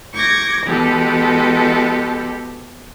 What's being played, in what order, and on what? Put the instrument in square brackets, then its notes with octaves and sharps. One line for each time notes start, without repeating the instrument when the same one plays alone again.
[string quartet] C#6 D6 G6 G#6 A#6
B2 E3 G#3 G4 A4